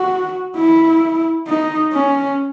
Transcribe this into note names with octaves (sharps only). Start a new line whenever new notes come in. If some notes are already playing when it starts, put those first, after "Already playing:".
Already playing: F#4
E4
D#4
C#4